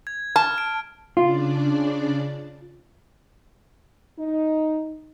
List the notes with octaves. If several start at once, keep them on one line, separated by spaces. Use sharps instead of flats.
G#6
A5 F6
D7
C#3 D4 F4 D5
D#4